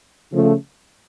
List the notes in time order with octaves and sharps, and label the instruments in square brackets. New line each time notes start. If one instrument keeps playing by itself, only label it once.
[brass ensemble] C#3 F3 A3